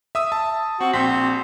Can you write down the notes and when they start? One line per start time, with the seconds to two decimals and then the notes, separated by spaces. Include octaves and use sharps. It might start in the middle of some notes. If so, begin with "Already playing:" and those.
0.15 E5 D#6 E6
0.32 A5
0.80 C4 F#4
0.93 A#1 C4 B6